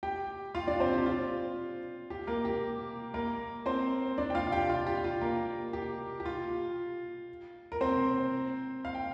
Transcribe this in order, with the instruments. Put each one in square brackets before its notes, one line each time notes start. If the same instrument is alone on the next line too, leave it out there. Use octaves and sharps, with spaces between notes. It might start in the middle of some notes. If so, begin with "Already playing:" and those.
[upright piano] G4 G5
F4 F5
D4 D5
C4 C5
G4
F4
G4
A#3 A#4
G4
A#3 A#4
C4 C5
D4 D5
G5
F4 F5
F5
G4 G5
F4 F5
G4
F4
A#3 A#4
G4
G4
F4
A#4
C4 C5
F5
G5